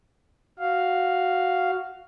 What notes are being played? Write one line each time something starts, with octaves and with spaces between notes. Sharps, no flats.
F#4 F5